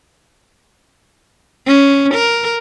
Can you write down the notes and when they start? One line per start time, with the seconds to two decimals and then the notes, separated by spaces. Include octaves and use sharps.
1.67 C#4
2.14 A#4